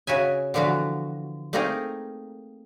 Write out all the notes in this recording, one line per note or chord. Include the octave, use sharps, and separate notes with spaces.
C#3 F#4 E5 G#5
D3 E3 F3 B3 F#4
A3 A#3 C4 D#4 G#4 A#4